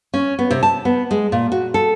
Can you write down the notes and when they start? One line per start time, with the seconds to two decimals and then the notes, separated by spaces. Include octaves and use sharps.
0.14 C#4
0.39 B3
0.51 C3
0.63 A5
0.85 B3
1.11 G#3
1.32 A#2
1.52 F#4
1.74 A4